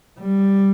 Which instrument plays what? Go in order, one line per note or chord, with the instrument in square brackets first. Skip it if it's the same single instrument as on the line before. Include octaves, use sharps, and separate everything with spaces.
[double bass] G3